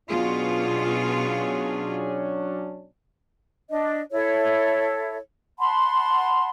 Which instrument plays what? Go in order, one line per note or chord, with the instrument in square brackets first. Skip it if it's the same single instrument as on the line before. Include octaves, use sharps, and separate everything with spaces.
[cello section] B2 F4 [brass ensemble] F#3 C#4 D4 [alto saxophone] G#4
[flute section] D4 D#5
E4 A4 C#5
F#5 A5 B5 C6